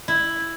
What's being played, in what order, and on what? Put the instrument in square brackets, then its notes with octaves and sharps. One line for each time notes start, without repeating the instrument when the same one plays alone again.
[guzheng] E4